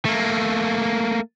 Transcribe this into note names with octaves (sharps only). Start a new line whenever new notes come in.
A3 A#3